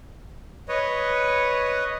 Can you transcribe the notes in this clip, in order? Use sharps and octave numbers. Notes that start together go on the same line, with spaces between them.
B4 C#5 D#5